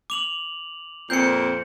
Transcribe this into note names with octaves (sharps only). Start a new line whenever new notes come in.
D6 F7 F#7
F2 A#2 C4 G6 C#7